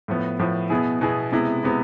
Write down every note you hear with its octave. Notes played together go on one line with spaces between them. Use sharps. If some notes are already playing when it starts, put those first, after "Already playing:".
A2 F3 B3
A2 F3 B3
B2 B3 E4 G#4
B2 B3 E4 G#4
C3 G#3 B3 E4
C3 G#3 B3 E4